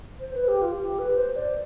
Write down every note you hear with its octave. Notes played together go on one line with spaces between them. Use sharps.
C5
B4
G4
F4
G4
B4
C5
D5